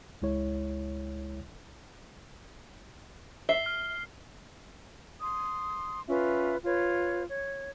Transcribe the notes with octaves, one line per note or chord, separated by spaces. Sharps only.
C#2 G#3 E4 C#5
E5 C7 G7
F6
C6 D#6
C#4 F4 B4 E5
F4 B4 C#5
C#5